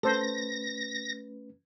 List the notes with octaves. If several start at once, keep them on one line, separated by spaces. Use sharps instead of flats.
A3 C#4 A4 B4 C5 A#6